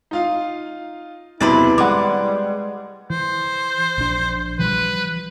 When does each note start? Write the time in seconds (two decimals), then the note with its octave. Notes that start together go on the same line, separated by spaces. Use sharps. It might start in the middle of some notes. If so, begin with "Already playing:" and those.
0.11 D#4 F4 F5
1.40 B1 E2 C3 E4 B4 C5 D5
1.78 G3 G#3 F#5 D6
3.10 E3 C5
3.98 A#1 D4
4.59 E3 F3 G3 B4